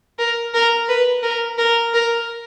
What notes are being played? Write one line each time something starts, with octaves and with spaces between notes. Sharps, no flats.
A#4
A#4
B4
A#4
A#4
A#4